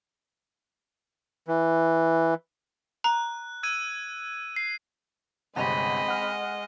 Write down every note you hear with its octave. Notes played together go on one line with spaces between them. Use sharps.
E3
A#5 F#6
E6 G#6 D#7
C7
G1 C3 G#3 C4 D#5 F#5 B5
F#5 F6